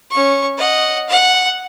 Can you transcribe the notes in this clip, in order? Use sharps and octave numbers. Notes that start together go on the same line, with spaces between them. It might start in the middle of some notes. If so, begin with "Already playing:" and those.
C#4 C#6
D#5 F#5
F#5